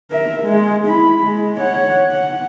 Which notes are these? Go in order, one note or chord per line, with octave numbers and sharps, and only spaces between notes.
A#4 E5
G#3
E4 B5
G#3
C#5 F#5
F#5